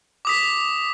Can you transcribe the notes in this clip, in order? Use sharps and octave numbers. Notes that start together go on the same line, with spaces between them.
D6 D#6 B6